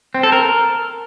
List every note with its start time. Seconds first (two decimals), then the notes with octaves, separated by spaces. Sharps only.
0.14 C4
0.23 A4
0.32 A#4